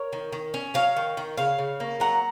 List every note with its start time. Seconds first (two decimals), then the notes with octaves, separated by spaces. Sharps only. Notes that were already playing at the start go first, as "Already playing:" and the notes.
Already playing: A#4 C#5
0.13 D#3
0.33 D#3
0.54 C#4
0.74 F#3 C#5 F5
0.97 D#3
1.17 D#3
1.37 C#3 C#5 F5
1.58 C#3
1.80 A#3
2.00 F#3 F#5 A#5